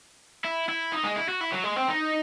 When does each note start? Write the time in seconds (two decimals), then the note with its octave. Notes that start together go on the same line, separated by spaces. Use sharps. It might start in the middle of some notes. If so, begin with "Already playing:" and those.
0.44 E4
0.69 E4
0.93 D#4
1.04 G#3
1.16 E4
1.29 F#4
1.41 E4
1.52 F#3
1.64 G#3
1.76 C4
1.88 D#4